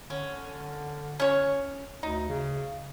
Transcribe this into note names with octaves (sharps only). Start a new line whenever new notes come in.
D3 C#4
C#4 C#5
D2 D#4
C#3